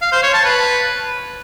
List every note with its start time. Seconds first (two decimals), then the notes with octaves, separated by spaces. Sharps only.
0.02 F5
0.12 C5
0.23 C#5
0.34 A5
0.44 B4